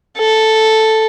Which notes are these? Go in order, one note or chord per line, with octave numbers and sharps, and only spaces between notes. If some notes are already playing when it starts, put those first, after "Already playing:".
A4